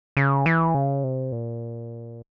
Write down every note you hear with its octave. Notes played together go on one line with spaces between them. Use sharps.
C#3
E3
C#3
C3
A#2